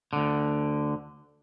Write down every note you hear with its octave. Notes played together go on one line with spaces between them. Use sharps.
D2 D3